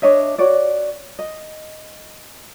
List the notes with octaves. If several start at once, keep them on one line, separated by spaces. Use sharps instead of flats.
D4 C#5 D#5 E5
F#4 C#5 D5
D#5